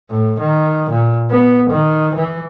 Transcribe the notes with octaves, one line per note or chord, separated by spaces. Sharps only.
A2
D#3
A#2
B3
D#3
E3